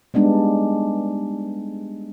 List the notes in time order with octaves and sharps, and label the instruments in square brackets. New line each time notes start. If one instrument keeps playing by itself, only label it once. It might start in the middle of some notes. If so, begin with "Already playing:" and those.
[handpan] G3 G#3 B3 D4 D#4